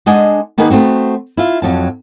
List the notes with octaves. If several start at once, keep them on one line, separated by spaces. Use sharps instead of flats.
G#3 D4 D#5 F#5 G#5
D#3 A#3 B3 D#4 G#4 B4
A3 B3 C4 F#4
E4 F4 E5
F2 F#3 A5